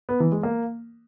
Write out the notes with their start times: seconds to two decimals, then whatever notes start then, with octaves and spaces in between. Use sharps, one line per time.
0.09 B3
0.20 E3
0.32 G#3
0.43 A#3